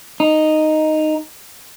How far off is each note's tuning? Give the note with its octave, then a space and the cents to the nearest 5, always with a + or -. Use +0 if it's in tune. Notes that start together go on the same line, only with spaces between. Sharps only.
D#4 -5